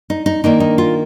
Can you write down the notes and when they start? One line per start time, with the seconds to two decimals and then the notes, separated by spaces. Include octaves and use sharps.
0.10 D#4
0.26 D#4
0.44 D#3 A#3 D4 D#4
0.60 D#4
0.78 F4